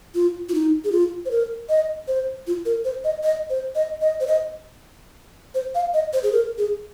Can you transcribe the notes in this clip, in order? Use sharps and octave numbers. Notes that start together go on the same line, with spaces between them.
F4
F4
D#4
G#4
F4
C5
A#4
D#5
C5
F4
A#4
C5
D#5
D#5
C5
D#5
D#5
C5
D#5
C5
F5
D#5
C5
G#4
A#4
G#4